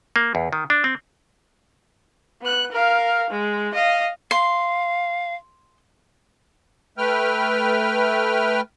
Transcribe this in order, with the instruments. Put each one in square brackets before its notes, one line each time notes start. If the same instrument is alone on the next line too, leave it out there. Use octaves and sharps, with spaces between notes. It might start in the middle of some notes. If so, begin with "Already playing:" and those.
[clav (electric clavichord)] A#3
E2
D#3
D4
C4
[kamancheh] B3 F#6
A#4 F5
G#3
D#5 F5
[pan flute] F5 [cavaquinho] C6
[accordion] A3 B4 G5 F6